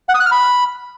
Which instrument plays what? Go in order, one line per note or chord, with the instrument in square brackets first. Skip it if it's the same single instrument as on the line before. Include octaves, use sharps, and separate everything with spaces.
[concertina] F#5
D#6
F#6
F6
B5